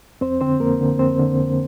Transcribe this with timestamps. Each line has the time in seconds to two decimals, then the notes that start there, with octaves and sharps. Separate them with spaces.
0.21 F2 C4 C5
0.41 D3 C4 C5
0.60 F2 A#3 A#4
0.81 D3
0.99 F2 C4 C5
1.19 D3
1.38 F2